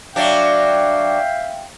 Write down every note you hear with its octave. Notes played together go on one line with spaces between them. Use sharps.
F#3 D4 E5 F5 G5